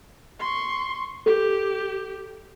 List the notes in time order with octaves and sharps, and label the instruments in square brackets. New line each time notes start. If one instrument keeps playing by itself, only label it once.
[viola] C6 C#6
[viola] G4 [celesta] A4